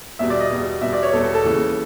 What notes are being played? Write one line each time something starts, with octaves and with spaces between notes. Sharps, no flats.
E2 B2 G3 E5
D5
D#5
E2 B2 G3
E2 B2 G3 E5
D5
C#5
E2 B2 G3 A4
A4
A4
D#2 C#3 E3 G#3